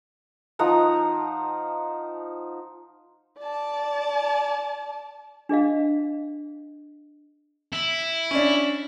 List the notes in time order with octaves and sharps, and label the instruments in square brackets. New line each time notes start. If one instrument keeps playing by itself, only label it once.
[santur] F3 D#4 F#5 A#5
[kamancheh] D5 A5
[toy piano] D4 G#4 D#5 F5
[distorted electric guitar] E4
[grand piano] C#4 D4